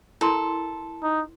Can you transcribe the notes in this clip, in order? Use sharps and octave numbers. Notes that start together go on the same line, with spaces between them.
E4 A4 A#4 C6
D#4